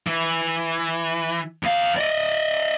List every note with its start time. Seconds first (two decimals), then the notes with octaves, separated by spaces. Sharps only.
0.07 E3
1.63 E2 F5
1.97 D5 D#5